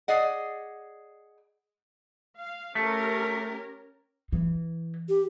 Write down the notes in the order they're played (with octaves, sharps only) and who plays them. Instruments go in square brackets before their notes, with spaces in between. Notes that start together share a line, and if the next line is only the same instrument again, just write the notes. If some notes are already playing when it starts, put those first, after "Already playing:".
[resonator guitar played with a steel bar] G#4 D5 D#5 F#5
[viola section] F5
[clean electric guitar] A3 [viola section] C#4 G4 A#4
[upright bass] E3
[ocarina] G4